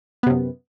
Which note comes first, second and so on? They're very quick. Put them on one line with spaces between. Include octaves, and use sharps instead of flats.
B3 C3 F#2